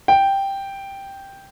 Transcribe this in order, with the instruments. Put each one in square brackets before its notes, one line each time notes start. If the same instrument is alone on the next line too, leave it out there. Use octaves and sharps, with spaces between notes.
[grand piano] G5